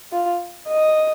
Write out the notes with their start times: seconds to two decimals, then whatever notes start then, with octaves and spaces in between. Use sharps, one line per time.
0.12 F4
0.68 D#5